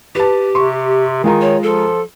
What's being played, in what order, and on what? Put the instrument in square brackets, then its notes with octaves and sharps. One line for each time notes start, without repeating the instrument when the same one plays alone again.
[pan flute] G4 [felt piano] B4 A5
[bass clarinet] C3 [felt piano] C6 C#6
[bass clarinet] D#3 [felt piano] G#3 F4 A#5
[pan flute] C#5
[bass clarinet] F3 [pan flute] A4